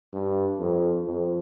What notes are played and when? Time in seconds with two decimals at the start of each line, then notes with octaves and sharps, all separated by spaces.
0.14 G2
0.60 F2
1.07 F2